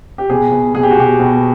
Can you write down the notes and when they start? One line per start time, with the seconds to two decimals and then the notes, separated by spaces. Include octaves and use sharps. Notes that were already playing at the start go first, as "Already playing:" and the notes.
0.18 G4
0.29 B2 G#4
0.52 B2
0.75 B2 G#4
0.83 G4
0.91 F#4
0.97 B2 G4
1.20 B2